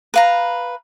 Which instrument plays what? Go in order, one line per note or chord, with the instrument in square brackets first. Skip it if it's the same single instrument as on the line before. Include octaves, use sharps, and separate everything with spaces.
[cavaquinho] B4 F5 A#5